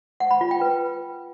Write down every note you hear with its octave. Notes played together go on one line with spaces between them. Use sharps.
F#5
B5
F4
G5
B4